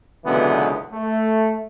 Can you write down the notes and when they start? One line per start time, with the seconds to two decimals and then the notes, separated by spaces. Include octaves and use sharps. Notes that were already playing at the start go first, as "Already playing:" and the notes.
0.25 C#2 F#2 B2 D3 E3 B3
0.92 A3